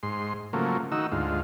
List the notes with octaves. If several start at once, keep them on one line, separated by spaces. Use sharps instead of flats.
G#2 C6
C#3 F3 F#3 A3 A#3
D#3 D#4 F#4 E6
D2 G#2 F4